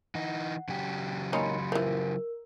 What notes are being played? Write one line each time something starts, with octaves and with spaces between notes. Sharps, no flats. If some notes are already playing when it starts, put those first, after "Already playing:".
E3 D#4 F#5
C#3 F#3 G4
D#3 A#3 C#4 B5 C6 C#7
E3 F3 A#4